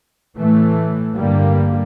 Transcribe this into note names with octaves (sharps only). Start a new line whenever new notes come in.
A2 E3 A3
G2 D3 G3 A#3